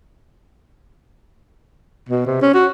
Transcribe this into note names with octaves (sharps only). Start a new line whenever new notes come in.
B2
C3
C#4
F#4